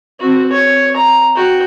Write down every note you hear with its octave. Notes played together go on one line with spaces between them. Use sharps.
C4 F#4
C#5
A#5
F#4 G5